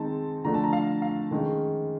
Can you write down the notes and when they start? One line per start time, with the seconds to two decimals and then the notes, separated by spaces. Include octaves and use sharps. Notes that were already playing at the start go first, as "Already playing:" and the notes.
Already playing: D#3 G#3 C4 D#4 A5
0.44 D3 F3 A3 D4 A#5
0.54 A5
0.64 A#5
0.73 F5
1.02 F5
1.31 D#3 G#3 C#4